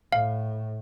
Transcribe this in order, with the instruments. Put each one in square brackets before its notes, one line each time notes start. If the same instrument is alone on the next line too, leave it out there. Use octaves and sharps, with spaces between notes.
[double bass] A2 [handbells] F5